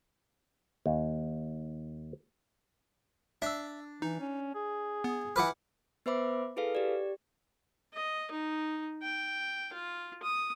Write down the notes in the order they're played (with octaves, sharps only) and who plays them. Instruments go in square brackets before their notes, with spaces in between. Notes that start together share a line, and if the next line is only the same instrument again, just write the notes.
[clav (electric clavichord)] D#2
[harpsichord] D4 [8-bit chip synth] E5 E6
[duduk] E3 [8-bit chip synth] D#4
[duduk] C#4
G#4
[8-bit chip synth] B3
[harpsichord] E3 B4 [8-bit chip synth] F#5 D6 F6
[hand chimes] B3 B4 C5 E5 B5 D6
E4 G#4 A4 B4 F5
G4 D5
[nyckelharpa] D#5
D#4
G5
F4
D#6